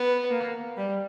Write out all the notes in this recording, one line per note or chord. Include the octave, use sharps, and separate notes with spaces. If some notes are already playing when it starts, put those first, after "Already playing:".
Already playing: B3
A#3
G3